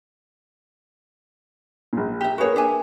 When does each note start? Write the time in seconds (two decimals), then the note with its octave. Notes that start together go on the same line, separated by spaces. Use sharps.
1.93 A#1 A#2
2.21 G4 E5
2.38 A#3 F#4 G#4 B4 C#5
2.56 D4 E5 G#5